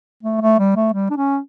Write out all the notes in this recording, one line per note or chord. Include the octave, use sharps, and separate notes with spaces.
A3
A3
G3
A3
G3
D4
C#4